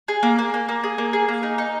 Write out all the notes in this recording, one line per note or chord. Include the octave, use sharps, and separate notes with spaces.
G#4
A#3
A#3
A#3
A#3
G#4
A#3
G#4
A#3
D#4
D#4